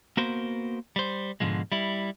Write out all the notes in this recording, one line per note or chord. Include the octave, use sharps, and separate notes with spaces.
A#3 B3 F#4 A#4 C5
G3 C5
G#2 B2 D3 F3 G#3
G3 E4